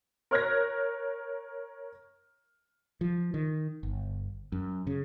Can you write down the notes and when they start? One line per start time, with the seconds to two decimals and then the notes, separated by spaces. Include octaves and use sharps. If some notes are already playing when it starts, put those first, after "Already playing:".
0.31 A#4 C#5 F6 F#6 G#6 A#6
3.01 F3
3.34 D#3
3.83 G1
4.52 F#2
4.87 C#3